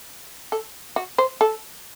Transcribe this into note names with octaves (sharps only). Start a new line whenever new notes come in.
A4
F#4
C5
A4